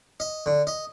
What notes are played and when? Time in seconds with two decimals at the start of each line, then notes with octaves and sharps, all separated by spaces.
0.20 D#5
0.46 D3
0.67 D#5